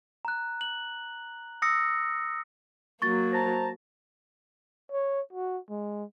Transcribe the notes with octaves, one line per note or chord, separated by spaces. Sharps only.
A#5 F#6
F#7
D#6 E6 A#6 C#7
F#3 A#3 C#6 A6
C5 A5 A#5
C#5
F#4
G#3